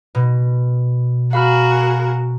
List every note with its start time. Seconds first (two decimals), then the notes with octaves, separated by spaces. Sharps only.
0.15 B2
1.33 F#4 G#4 A#4 F5 B5 F6